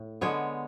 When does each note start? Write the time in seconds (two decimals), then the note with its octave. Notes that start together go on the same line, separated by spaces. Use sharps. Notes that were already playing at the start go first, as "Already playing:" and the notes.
Already playing: A2
0.21 D3 G#3 B3 C#5